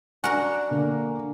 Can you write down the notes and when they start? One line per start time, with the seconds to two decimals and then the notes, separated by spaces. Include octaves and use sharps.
0.24 D4 F#4 A#4 G#5 F#6
0.71 D3 A#3